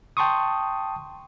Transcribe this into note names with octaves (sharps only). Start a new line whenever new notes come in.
G5 A5 C6 C#6 D#6